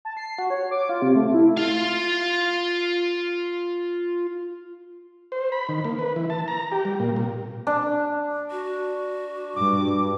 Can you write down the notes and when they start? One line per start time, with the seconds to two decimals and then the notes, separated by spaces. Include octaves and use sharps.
0.05 A5
0.17 C7
0.39 F#4
0.50 C#5
0.71 D6
0.89 F4
1.02 C3
1.16 A3
1.34 E4
1.58 F4 F5
5.32 C5
5.52 B5
5.69 D#3
5.85 A#3
5.99 B4
6.16 E3
6.30 A5
6.48 A#5
6.72 G4
6.85 G3
7.00 A#2
7.16 A#2
7.67 D4
8.51 F#4
9.56 G2 D6